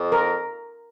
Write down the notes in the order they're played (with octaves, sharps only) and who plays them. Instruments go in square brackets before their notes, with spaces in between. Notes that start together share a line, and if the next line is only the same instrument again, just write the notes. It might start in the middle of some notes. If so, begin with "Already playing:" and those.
Already playing: [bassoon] F2
[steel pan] A#4